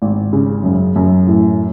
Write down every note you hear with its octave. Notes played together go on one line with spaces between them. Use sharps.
G#1
C#3
F#2
F#2
A2